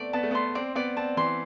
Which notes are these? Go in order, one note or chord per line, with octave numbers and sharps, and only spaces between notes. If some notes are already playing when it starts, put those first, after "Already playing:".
Already playing: A3 B3 C4 D5
B3 A5
A3
B3 C6
C4 D5
B3 D5
C4 A5
E3 C6